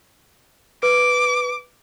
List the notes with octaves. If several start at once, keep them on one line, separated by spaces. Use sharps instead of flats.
B4 D6